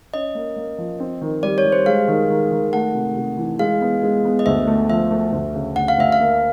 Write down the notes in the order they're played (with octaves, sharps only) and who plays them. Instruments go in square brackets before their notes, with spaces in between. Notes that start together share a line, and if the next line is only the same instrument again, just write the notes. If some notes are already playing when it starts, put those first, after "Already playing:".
[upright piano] C#4 [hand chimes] D#5
[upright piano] A#3
A#3
F3
C4
D#3
[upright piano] G3 [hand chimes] D5
[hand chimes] C#5
[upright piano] G3
[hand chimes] C5
[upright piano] G#3 [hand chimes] F5
[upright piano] D#3
D#3
D#3
[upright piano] A3 [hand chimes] F#5
[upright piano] C3
C3
E3
[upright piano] G#3 [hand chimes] F5
[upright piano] B3
G#3
B3
[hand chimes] D#5
[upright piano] D2 [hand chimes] E5
[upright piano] A3
[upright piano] F3 [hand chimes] E5
[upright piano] A3
D2
C#3
[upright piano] D2 [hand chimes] F#5
[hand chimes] F5
[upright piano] D2 [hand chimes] E5
[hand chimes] F5
[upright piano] A#3